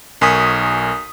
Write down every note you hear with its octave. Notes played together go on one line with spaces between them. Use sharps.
B1 A#4 G#5 C#6 D#6 B6